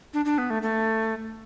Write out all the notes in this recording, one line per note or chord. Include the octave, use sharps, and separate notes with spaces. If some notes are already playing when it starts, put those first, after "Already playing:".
D4
D4
B3
A3
A3